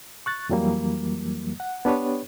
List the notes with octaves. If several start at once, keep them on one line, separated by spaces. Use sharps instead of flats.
C#6 F#6 A6
F2 E3 F#3 G3 A#3
F#5
B3 D4 G4 B4 C#5